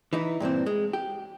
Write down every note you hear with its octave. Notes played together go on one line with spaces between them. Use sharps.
E3 D#4 E4
G2 A#2 E3 C4
G#3
G4